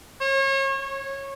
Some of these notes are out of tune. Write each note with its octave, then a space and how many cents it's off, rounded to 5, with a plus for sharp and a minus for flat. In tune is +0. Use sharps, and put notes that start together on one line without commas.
C#5 -35
C#5 -15